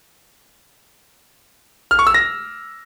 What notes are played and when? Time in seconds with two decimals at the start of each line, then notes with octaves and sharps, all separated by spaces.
1.91 F6
1.99 C#6
2.07 E6
2.14 A#6